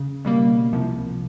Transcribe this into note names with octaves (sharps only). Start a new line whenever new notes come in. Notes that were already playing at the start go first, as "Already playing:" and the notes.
Already playing: C#3
B2 G3 A#3
C2 C3 F3